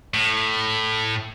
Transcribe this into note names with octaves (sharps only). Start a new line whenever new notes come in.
A2